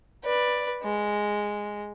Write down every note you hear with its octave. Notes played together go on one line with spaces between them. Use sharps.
B4 D5
G#3